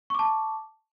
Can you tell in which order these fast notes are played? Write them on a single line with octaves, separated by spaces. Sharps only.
C#6 D6 A5